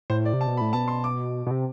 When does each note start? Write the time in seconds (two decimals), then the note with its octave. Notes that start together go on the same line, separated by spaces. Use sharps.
0.10 A2 C5
0.25 D5
0.33 C3
0.41 A5
0.47 B2
0.57 B5
0.61 A2
0.73 B2 A5
0.88 C6
1.04 D6
1.46 B2
1.51 C3